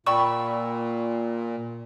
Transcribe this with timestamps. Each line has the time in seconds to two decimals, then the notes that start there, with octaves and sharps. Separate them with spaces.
0.06 A#2 D5 G5 B5 C#6 E6